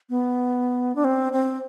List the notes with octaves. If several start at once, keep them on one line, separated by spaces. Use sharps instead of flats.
B3
D4
C4
C4